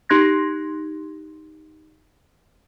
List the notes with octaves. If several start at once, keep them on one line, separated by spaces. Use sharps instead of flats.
D#4 G4 C6 F#6 G#6 A#6